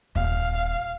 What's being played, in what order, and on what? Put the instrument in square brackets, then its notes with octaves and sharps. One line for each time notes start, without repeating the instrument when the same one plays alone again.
[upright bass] D#1 [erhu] F5